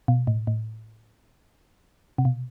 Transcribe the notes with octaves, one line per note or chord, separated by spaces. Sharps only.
B2
A2
A2
C3
B2